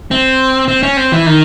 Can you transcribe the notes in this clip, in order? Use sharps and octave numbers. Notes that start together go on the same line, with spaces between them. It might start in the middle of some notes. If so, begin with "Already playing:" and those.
C4
C4
C#4
C4
E3
D#3